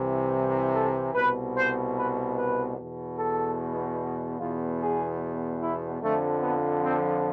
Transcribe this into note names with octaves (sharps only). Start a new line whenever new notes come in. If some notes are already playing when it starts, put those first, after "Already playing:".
Already playing: C2 C3 E3
A4
C2 B2 B4
C5
B4
B4
E2 B2
A4
E2 B2 F4
G#4
E4
F2 D3 F3 A3
B3
C4